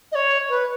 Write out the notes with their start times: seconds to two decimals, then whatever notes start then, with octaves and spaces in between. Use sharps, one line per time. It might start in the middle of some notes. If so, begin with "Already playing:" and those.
0.12 D#5
0.15 C#5
0.49 B4